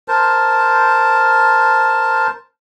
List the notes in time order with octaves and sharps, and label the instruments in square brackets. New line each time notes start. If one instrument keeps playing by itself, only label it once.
[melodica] A#4 C5 A5